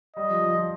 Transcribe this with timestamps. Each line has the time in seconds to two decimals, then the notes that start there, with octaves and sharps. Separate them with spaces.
0.17 G3 D#5
0.29 F3
0.42 F3
0.54 F3